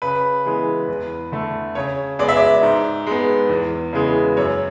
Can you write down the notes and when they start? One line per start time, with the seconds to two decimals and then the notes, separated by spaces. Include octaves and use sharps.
0.02 C#3 B4
0.45 E3 G#3 B3
0.88 E2
1.32 D3 A3
1.75 C#3 C#5
2.19 G#3 B3 D5
2.29 E5
2.37 D5
2.63 G#2
3.07 G#3 B3
3.49 E2
3.93 C#3 E3 G#3 B3
4.37 F#2 C#5